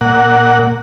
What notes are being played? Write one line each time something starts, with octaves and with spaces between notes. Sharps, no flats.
A#2 F#5